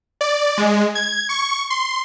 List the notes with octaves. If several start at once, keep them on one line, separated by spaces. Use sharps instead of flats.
D5
G#3
G#6
C#6
C6